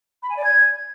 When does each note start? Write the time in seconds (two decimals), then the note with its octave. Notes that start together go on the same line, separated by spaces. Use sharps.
0.22 B5
0.29 G#5
0.37 D5
0.44 G#6